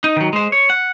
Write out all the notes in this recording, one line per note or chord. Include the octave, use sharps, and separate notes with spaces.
D#4
D#3 F#3
G#3 C5
C#5
F#5